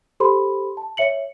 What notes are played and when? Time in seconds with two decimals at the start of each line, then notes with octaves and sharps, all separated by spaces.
0.20 G4 A4 C5 B5 C6
0.77 A5
0.97 C#5 E5 C#7 F#7